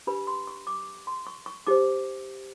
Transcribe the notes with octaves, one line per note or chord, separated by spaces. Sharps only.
D4 G4 B4 B5
C6
C#6
D6
C6
C#6
C#6
D#4 G4 C5 D6